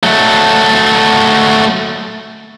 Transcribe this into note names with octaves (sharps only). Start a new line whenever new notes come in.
F#3 A3